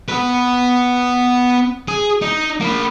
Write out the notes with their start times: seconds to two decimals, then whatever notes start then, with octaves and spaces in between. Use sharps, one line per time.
0.08 B3 B4
1.88 G#4
2.22 D#4
2.60 A#3 B5